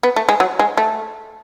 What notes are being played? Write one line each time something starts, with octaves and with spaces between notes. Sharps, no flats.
B3
A3
G#3
F#3
G#3
A3